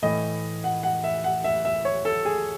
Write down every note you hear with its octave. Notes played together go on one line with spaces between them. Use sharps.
A2 E3 D#5
F#5
F#5
E5
F#5
E5
E5
C#5
A4
G#4